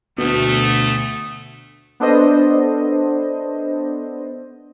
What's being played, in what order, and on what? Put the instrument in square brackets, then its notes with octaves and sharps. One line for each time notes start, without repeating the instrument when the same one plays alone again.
[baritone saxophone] D2 [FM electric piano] B2 [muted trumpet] A3 [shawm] D#6
[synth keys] B3 D4 A4 C5 D#5